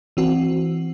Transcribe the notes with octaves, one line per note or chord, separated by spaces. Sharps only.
E3 C4 F#4